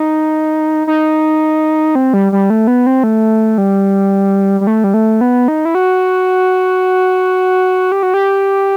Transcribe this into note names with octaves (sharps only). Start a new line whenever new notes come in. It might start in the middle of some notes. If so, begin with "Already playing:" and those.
Already playing: D#4
D#4
C4
G3
G3
A3
B3
C4
A3
G3
G3
A3
G3
A3
B3
D#4
E4
F#4
G4
F#4
G4